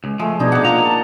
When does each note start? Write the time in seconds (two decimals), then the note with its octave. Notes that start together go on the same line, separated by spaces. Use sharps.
0.04 C#2
0.19 F3 G#3 A3
0.39 B2 D4 D#4 G#4 D5
0.52 C2 A#2 F#5 D6
0.65 A#3 F4 D#5 A#5
0.85 A5